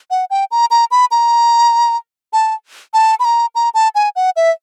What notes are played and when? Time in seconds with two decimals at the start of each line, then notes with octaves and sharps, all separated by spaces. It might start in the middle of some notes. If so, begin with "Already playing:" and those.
0.11 F#5
0.30 G5
0.51 A#5
0.71 A#5
0.91 B5
1.11 A#5
2.33 A5
2.94 A5
3.20 B5
3.25 A#5
3.55 A#5
3.74 A5
3.95 G#5
4.16 F#5
4.36 E5